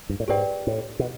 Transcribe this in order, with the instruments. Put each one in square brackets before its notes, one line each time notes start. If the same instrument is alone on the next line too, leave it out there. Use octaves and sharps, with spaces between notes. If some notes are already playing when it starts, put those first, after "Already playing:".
[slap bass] G2
A2
[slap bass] G#2 [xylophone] G4 B4 D5 G5
[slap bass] A2
B2